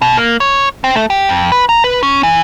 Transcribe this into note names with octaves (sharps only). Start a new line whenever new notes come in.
B2
A#3
C#5
C4
A3
G4
F2
B4
A#5
B4
C#4
E3